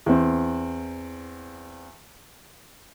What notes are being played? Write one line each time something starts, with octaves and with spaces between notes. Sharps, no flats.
E2 C4